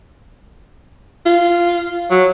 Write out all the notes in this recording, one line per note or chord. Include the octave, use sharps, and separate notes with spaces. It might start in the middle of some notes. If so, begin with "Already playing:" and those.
F4
F#3